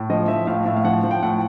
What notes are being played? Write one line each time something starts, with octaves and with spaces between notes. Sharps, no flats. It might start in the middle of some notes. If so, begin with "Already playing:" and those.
Already playing: A2
F3 D#5
F3 E5
A2 F5
A2 E5
F5
F3 F#5
F3
G5
A2 F#5